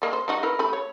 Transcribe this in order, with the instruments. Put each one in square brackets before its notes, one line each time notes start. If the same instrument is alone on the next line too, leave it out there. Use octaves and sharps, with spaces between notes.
[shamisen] G3 A#3 D#5
C5
G3 D#4 F#4
E4 A#4 B4
A3 G4 B5
C#5